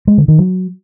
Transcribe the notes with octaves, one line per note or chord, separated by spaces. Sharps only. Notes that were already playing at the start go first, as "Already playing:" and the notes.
G#3
D3
D#3
F#3